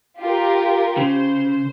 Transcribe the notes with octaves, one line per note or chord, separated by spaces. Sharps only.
F4 G4 A#4
C#3 C5